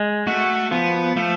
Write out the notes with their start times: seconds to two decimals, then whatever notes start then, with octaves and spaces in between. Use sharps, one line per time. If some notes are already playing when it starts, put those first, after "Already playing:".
Already playing: G#3
0.27 A3 F#4
0.71 F3 B3
1.16 F3 A3